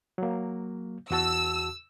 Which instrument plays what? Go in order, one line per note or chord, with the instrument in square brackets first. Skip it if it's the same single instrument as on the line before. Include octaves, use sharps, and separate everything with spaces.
[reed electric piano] F#3 A#3
[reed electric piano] E2 F#4 A5 [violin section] E6